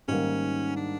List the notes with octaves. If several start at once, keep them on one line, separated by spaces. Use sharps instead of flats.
G#2 D#3 G3 A#3 C#4
D4